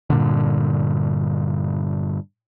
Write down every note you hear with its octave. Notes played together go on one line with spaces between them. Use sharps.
G2 A#2 D3